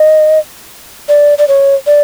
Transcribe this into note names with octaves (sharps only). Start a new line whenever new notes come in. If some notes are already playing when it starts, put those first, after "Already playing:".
Already playing: D#5
D5
D5
C#5
D5